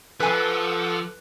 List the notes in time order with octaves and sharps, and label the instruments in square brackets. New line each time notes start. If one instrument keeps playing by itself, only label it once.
[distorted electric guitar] F3 [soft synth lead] A4 [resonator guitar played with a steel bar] B4 G#5 [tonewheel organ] F#5 D6 E6